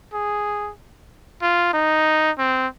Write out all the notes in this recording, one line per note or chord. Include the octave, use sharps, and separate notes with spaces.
G#4
F4
D#4
C4